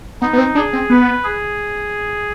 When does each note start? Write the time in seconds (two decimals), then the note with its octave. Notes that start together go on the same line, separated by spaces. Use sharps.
0.21 B3 D#4
0.33 B3
0.38 C4
0.55 D4 G#4
0.73 C4
0.90 B3 B4
1.24 G#4